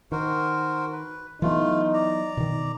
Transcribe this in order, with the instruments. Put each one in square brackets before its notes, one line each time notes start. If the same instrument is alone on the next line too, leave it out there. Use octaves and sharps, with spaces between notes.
[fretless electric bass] D#3 [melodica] F#4 A#4 C5
[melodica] B4
[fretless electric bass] E3 F#3 B3 [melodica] A3 F4 [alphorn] D#4
[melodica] D5 A#5
[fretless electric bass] B2 D#3